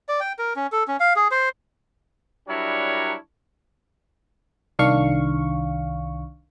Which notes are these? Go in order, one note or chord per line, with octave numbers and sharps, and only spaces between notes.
D5
G5
A#4
C#4
A4
C#4
F5
G#4
C5
F#3 G3 D4 E4 A#4 C#5
C2 D#3 D4 F5 C#6